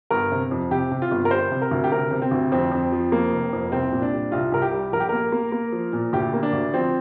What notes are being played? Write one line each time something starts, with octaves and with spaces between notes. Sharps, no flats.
G1 A#4
C3
F2
C3 G4
C3
F4
G1
A#4
G3 C5
C3
A#4
D2
G4
C3 A#4
C3
C4
D2
F2 C4
F2
F3
F2 A#3
F1
F2
C2 C4
A#2
D4
G3
C2 F4
C2 A#4
G4
G3
A#1 A#4
G4
A#3 A#4
A#3
A#3
F3
A#2
D2 G4
A#3
D4
D2
F3 C4